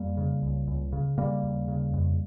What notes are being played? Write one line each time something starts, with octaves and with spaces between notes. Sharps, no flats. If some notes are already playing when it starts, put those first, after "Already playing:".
Already playing: F2 G3 A#3
C#3
C#2
C#2
C#3
C#3 G3 A#3
D#2
C#3
F2